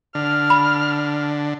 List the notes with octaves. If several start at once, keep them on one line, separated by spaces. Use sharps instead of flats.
D3 F6
B5